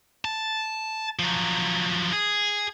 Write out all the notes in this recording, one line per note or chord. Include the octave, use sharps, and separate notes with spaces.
A5
F3 F#3
G#4